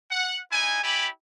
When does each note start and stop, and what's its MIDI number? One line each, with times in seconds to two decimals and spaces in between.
0.11 0.39 78
0.52 0.81 63
0.52 0.81 64
0.52 0.81 80
0.84 1.08 64
0.84 1.08 67
0.84 1.08 74
0.84 1.08 80
0.84 1.08 83